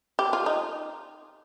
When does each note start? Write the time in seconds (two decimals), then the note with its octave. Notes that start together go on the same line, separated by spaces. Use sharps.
0.19 G4
0.33 F4
0.46 D#4